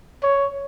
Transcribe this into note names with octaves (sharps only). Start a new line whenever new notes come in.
C#5